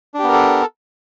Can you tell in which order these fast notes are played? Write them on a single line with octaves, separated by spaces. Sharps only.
D4 G4 B3 A#4 A4